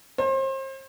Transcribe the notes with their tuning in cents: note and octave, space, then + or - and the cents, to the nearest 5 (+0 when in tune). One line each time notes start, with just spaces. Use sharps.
C5 +35